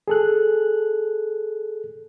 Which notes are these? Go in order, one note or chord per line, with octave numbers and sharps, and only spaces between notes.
G#4 A4 F#6